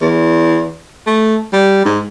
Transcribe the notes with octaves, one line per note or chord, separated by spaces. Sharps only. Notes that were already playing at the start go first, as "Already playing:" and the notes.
E2
A3
G3
G#2